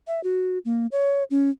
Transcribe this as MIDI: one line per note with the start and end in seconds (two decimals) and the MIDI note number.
0.07 0.22 76
0.24 0.58 66
0.65 0.87 58
0.92 1.24 73
1.31 1.50 61